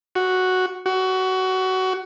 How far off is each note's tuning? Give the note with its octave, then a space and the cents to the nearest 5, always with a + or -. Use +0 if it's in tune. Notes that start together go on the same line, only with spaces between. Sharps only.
F#4 +0
F#4 +20